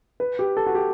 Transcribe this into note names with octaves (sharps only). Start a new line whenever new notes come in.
B4
G4
A4
F#4
G4